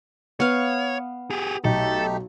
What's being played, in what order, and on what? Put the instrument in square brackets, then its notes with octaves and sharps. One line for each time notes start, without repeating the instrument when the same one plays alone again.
[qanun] B3 F5 [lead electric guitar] C#5
[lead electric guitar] G4 G#4
[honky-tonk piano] B1 [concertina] A3 D#4 G4 [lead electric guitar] A4